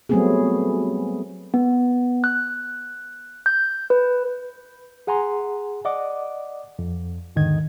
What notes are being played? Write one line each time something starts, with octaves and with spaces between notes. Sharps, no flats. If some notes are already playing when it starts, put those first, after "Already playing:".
F#3 G3 A3 B3 C4 G#4
B3
F#6
G6
B4
G#4 F#5 G#5 A#5 C6
D5 D#5 F#5 D6
F2
E2 G#2 D3 D#3 D#5 G#6